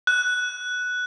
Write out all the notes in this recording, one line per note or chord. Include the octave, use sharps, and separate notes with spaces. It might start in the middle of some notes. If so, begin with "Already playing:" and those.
F#6